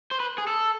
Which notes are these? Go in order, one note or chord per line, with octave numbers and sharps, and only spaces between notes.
C5
B4
G#4
A4